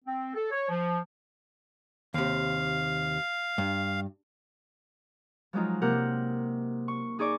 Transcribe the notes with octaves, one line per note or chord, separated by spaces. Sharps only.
C4
A4
C#5
F3
D#2 C3 F5
G2
F3 F#3 G#3 D#4 F4
C3 A#3 A#4 F#5 G6
C#6
D#4 G#4 D5 C#6 D6